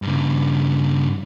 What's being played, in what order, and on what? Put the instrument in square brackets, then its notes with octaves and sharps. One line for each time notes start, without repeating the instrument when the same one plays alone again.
[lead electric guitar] G2 C#3